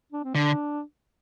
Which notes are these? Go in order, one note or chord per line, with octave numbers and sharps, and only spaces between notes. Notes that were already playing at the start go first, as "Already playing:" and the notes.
D4
C4
D3 D4